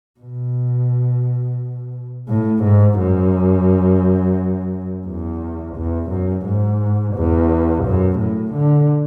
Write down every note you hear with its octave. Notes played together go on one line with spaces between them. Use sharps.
B2
A2
G#2
F#2
E2
E2
F#2
G#2
E2
F#2
A2
D3